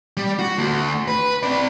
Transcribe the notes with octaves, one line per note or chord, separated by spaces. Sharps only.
G3
F#4
D2
B4
C4 D5